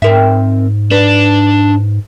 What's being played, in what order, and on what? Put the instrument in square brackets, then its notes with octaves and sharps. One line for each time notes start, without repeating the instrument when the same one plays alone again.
[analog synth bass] G#2 [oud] C4 A#4 E5
[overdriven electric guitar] D4 [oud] B4